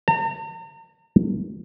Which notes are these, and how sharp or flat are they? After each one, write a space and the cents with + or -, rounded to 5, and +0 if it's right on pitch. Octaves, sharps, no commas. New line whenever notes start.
A#5 -40